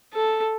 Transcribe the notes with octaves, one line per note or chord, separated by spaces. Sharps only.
A4